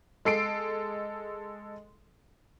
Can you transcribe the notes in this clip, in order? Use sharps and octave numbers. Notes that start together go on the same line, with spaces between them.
G#3 A4 C7 D7